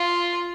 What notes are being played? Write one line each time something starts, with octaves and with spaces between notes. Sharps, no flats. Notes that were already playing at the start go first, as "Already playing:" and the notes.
Already playing: F4